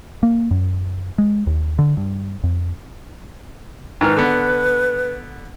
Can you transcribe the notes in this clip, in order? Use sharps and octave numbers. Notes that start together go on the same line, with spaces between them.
A#3
F#2
G#3
D#2
D3
G2
F2
G#2 D#3 B4 F6
D3 B3